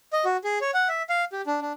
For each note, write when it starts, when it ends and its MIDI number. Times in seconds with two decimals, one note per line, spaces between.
0.13 0.25 75
0.25 0.37 66
0.44 0.59 68
0.61 0.71 73
0.74 0.88 78
0.88 1.02 76
1.09 1.25 77
1.33 1.42 67
1.47 1.61 62
1.61 1.73 62